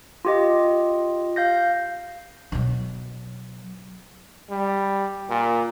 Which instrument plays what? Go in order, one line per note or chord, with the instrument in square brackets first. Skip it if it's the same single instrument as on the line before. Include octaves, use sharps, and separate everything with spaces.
[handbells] F4 G4 D#5
F5 G6 A#6
[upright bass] B2 F#3
[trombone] G3
A#2